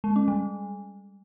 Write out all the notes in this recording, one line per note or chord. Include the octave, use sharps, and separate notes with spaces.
G#3
C#4
G3